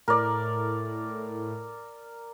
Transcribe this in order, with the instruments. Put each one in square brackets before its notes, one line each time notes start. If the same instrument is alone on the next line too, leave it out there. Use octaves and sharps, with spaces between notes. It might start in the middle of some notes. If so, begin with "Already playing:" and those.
[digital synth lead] A2 [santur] A#4 D5